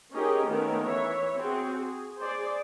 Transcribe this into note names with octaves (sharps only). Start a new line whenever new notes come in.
C#4 D#4 G4 G#4 A#4 D#5
D#3 A3 B3 C#4 D#4 A#4
E3 C#5 E5
C4 F#4 G#4
G#4
G#4 C5 D5